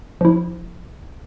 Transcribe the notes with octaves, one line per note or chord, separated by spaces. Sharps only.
F3 E4